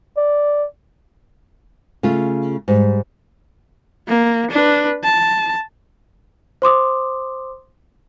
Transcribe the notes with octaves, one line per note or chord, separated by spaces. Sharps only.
D5
C#3 A3 F4
G#2 G3
A#3
D4 B4
A5
C5 C6 D6 D#6